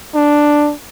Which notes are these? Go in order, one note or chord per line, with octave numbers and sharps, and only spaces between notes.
D4